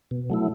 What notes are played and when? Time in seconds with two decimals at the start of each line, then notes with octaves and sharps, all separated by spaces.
0.11 B2
0.30 F#3 A3 E4